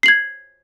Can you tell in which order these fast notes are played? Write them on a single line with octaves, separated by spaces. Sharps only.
C7 F#7 G#6